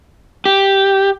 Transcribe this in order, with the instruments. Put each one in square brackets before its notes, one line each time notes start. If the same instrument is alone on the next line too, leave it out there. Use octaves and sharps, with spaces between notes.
[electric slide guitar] G4